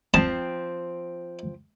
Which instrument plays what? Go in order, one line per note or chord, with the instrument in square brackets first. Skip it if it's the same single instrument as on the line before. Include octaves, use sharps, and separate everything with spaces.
[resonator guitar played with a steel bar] F3 C4 [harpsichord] A5